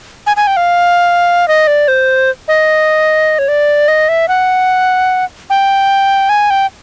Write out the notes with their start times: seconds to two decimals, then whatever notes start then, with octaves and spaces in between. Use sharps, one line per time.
0.27 G#5
0.37 G#5
0.47 G5
0.57 F5
1.48 D#5
1.67 D5
1.88 C5
2.48 D#5
3.39 C#5
3.48 D5
3.88 D#5
4.09 E5
4.28 F#5
5.50 G5
6.29 G#5
6.50 G5